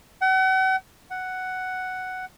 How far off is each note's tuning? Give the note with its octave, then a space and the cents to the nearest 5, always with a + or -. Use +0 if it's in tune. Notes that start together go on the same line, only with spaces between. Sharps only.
F#5 +40
F#5 +5